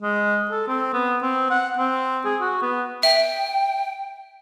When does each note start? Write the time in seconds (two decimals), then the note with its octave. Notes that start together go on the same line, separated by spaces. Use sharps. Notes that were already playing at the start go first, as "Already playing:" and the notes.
0.02 G#3
0.51 A4
0.68 C4
0.94 B3
1.22 C4
1.50 F#5
1.79 C4
2.25 G#4
2.41 F#4
2.62 B3
3.03 E5 G5